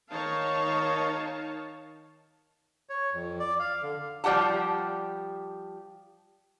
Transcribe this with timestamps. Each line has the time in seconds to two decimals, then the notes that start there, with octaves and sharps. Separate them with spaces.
0.11 D#3 D#4 C#5 F5 A5
2.89 C#5
3.13 F2
3.39 D5
3.60 F5
3.82 D3
4.24 F3 G3 G4 F#5 A5